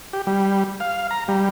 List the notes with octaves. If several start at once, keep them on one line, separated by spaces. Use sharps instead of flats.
G4
G3
F5
A#5
G3